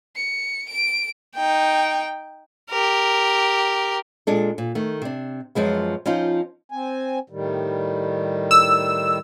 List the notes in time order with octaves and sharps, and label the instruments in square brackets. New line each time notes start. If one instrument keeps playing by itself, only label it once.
[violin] C#7
D7
D#4 G5
[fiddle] G4 A#4
[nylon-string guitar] A#2 G#3 D4 A4
A#2
D#3 A3
C3 D4
F#2 F3 G#3 B3
F3 C#4 D#4 F4
[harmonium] C4 G#5
A2 D#3 G3
[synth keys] E6